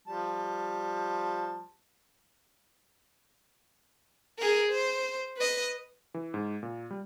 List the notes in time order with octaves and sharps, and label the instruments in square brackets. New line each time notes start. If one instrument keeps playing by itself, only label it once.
[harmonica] F3 G3 A5
[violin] G#4 A#4
C5
B4 D#5
[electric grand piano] E3
G#2
A#2
G3